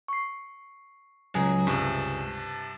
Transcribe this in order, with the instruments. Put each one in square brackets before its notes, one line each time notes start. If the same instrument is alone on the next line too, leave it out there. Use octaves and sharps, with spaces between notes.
[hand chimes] C#6 C7
[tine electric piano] C#2 G#4 [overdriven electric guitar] F#3
[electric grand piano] G2 C3 [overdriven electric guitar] A5